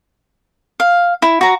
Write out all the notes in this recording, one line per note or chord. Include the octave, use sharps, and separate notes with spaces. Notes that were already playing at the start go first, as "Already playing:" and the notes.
F5
E4
F#4 A#5